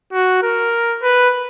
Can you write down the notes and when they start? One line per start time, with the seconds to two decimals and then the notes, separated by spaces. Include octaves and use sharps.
0.13 F#4
0.43 A#4
1.02 B4